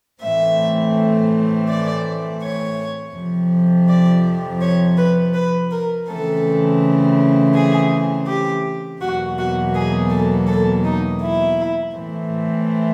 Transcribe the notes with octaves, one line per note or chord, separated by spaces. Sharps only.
A2 E3 A3 C4 E5
D5
C#5
F2 C3 F3
D5
C#5
B4
B4
A#4
C#3 E3 A3 C4 A4
G#4
G4
E2 B2 F#3 A#3 F#4
F#4
G#4
A4
A4
D#4
E4
A2 E3 A3 C4